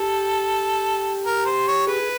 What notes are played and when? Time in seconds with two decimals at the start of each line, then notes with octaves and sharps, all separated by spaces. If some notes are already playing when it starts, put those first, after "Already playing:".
Already playing: G4 A4
1.25 A#4
1.45 C5
1.67 C#5
1.87 G#4 B4